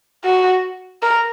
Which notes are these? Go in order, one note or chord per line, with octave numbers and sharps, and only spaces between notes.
F#4
A#4